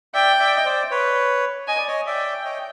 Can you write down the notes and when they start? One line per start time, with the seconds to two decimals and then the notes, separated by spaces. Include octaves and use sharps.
0.14 D5 E5 G5
0.39 D5 E5
0.56 D#5
0.65 C5 D5
0.91 B4 C#5
1.68 D#5 G#5
1.78 D5
1.88 C#5 D#5
2.06 D5 E5 G5
2.45 C#5 D#5